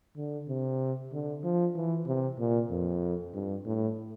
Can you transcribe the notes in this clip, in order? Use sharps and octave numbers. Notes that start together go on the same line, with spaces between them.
D3
C3
D3
F3
E3
C3
A#2
F2
G2
A2